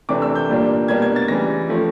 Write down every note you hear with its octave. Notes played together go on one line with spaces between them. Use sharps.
C3 E3 A3 D4 D6
E6
G6
A#2 G3 A#3 D4
B2 G3 A#3 D4 G#6
G#6
A6
C#3 E3 G3 A#6
F3 A3 C#4